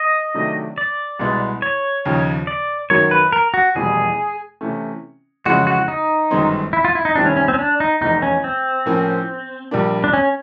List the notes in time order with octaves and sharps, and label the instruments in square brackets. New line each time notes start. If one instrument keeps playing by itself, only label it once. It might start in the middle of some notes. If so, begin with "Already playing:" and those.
Already playing: [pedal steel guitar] D#5
[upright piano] C3 D#3 F#3 A3 D4
[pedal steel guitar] D5
[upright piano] C2 B2 G#3 B3
[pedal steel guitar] C#5
[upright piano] D#2 C#3 F3
[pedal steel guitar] D5
[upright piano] F#2 D#3 F#3 A#3 [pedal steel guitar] C#5
[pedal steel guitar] B4
A#4
F#4
[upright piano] F1 E2 B2 G3 [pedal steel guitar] G#4
[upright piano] C3 E3 A3 C#4
[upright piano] F2 C#3 E3 G#3 [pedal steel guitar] F#4
[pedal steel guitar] F#4
D#4
[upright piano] G1 F#2 D#3 G#3 C4
[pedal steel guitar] E4
F4
E4
D#4
[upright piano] C3 D#3 G3 C4 E4 [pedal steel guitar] D4
[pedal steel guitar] C#4
C#4
C4
C#4
D4
D#4
[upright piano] F1 E2 C3 [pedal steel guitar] D#4
[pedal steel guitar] C#4
C4
[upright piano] A2 F3 A#3 C#4
A#1 A#2 G3 A#3 D4
[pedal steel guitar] D4
C#4